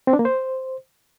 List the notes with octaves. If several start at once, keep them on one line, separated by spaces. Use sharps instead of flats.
C4
D4
A#3
C5